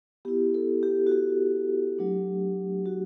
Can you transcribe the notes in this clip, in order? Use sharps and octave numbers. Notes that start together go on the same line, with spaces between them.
B3 E4 G4
A4
G4
F#4
G4
F#3 A3 D4
F#4